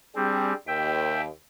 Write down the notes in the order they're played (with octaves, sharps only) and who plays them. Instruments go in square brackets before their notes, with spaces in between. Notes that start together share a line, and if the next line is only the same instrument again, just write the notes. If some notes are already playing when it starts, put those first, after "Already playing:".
[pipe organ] G3 C4 [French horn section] D4 G4 G#4
[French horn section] D#2 [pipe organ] E5 G5